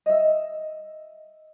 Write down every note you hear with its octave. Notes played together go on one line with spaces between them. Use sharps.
D#5 E5